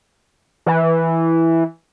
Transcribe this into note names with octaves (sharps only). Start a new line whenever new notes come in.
E3